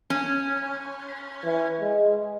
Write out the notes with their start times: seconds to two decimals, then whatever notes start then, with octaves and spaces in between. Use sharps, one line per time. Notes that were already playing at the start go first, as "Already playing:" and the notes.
0.10 C#4
1.44 E3
1.81 G#3